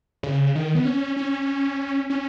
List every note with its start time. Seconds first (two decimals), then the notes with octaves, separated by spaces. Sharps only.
0.23 C#3
0.55 D#3
0.75 B3
0.85 C#4
1.16 C#4
2.10 C#4